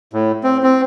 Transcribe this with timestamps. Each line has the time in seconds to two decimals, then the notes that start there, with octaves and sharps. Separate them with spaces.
0.13 A2
0.43 C4
0.63 C4